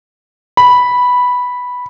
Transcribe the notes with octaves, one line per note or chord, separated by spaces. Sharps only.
B5